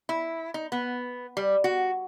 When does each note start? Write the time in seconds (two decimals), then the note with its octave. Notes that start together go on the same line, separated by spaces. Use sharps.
0.09 E4
0.54 D#4
0.72 B3
1.37 G3
1.64 F#4